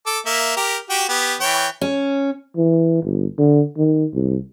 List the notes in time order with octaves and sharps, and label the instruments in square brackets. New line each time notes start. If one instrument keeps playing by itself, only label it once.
[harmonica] A4 D6
A#3 E5
G4 A#4
F#4 G4 G5
B3 G4
E3 C#5 G5
[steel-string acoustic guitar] C#4
[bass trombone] E3
G1
D3
D#3
C2